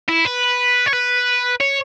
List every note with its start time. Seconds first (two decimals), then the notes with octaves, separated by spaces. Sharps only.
0.08 E4
0.25 B4
0.86 C#5
0.93 B4
1.61 C#5